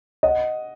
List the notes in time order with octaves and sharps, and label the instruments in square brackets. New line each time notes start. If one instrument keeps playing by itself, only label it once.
[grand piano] D#5 F#5